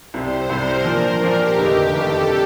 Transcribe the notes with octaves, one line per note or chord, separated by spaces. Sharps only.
C2 C3 G3 C5
C2 C3 G3 A#4
A#2 F3 A#3 D4 F4
A#2 F3 A#3 D4 F4 G4
F1 D#2 D3 A3 D#4
F1 D#2 D3 A3 D#4 A4
C3 G3